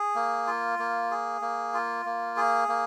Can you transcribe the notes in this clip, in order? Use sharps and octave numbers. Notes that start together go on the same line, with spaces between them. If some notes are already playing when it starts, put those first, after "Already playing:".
Already playing: G#4
A#3
F4
A#3
G#4
A#3
F4
A#3
G#4
A#3